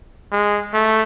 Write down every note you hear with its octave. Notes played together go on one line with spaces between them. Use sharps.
G#3
A3